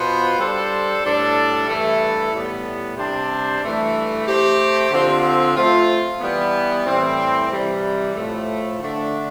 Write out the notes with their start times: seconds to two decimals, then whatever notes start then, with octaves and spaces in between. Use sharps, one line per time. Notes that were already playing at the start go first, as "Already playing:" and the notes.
Already playing: B2 B3 F4 C5
0.39 G3 D4 A4 C5
1.03 A2 G3 D4 A4
1.68 G2 E3 A3 E4 A4
2.33 A2 G3 B3
2.97 C3 G3 D4 G4 C5
3.62 G2 E3 A3
4.27 A3 C4 G4
4.91 D3 F3 C4
5.56 A3 C4 F4
6.20 E3 G3 B3
6.85 A2 E3 G3 C4
7.50 C3 E3 G3
8.14 A2 F3 A3
8.79 D3 A3 D4